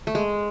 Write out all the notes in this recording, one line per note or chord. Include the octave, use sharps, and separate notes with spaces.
A3
G#3